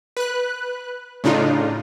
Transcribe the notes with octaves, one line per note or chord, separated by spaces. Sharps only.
B4 F#6
A2 C#3 D4 D#4 F4